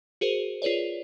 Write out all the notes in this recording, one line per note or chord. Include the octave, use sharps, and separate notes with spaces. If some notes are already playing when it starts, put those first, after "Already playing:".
F#4 G#4 A#4 C5
F4 G#4 B4 C#5 D5